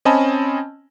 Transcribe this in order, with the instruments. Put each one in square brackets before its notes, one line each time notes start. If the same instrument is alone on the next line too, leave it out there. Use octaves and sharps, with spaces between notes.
[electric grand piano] C4 C#4 D#5 G#5 A5 B5